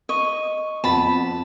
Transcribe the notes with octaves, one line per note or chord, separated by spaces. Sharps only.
D#5 C#6
F2 B3 A5 B5